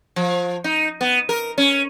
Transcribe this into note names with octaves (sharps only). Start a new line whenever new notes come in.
F3
D#4
B3
A#4
C#4